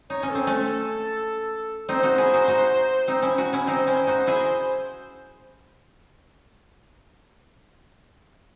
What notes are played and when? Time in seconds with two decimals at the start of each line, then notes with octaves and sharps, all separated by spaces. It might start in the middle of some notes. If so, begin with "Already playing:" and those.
0.10 D#4 C#5
0.23 C#4
0.29 A4
0.35 C4
0.47 A3 C#4 A4
1.88 C4 D#4 C5
2.03 D#4 F#4
2.18 E4 G#4
2.34 D#4 F#4
2.48 D#4 F#4
3.08 C4 D#4
3.22 C#4 E4
3.38 D#4 F#4
3.53 C#4 E4
3.67 C4 D#4 C5
3.87 C#4 E4
4.07 D#4 F#4
4.27 E4 G#4